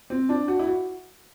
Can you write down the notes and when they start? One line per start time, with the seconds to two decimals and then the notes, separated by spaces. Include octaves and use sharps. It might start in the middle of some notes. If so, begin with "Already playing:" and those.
0.10 C4
0.29 D4
0.48 F#4
0.59 E4
0.67 F#4